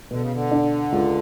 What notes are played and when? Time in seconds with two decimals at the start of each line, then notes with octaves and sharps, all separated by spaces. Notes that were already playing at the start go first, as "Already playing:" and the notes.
0.11 B2 D3
0.22 C#3
0.32 D3
0.51 D4
0.92 C#2